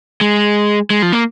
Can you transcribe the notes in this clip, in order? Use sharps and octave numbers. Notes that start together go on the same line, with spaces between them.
G#3
G#3
F3
A#3